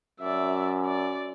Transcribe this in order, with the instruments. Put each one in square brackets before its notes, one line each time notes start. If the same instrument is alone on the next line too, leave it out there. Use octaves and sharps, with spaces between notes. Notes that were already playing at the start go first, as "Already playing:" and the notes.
[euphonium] F#2 [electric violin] D5 E5
[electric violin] D5